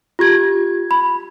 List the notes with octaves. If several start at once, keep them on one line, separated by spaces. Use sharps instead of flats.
F4 G4 G#6
B5